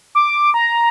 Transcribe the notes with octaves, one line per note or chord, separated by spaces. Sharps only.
D6
A#5